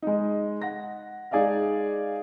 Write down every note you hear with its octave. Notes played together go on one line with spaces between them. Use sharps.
G#3 D#4
F#5 A#6
G#3 D#4 G#4 D5 D#5 F5